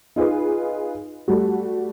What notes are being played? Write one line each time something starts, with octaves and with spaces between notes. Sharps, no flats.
D#4 F4 G#4 B4
G3 A3 F#4